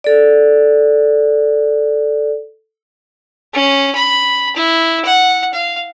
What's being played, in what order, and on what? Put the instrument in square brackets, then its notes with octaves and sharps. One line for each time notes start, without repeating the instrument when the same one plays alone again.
[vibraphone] A4 D5
[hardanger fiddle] C#4
B5
E4
F#5
F5